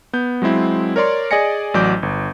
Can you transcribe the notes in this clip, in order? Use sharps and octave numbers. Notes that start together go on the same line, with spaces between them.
B3 G6
F#3 G#3 C4 E4
A#4 C#5 D5 C6
G#4 D5 D#5 G#5 A#6 C#7
A1 F#3 D5 D6 G6
G1